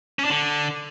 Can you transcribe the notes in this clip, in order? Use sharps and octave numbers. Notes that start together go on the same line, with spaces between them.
C#4
D4
D3